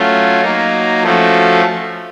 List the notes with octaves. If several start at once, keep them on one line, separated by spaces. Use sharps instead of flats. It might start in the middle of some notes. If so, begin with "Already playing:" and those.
Already playing: F#3 A3 C#4 F4
F#3 A#3 D#4
F3 A3 C#4 F#4 A4